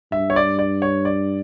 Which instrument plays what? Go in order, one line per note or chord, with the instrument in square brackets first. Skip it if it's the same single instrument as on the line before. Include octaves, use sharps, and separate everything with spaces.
[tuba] G2 [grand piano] E5
[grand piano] C#5
D5
D5
C#5
D5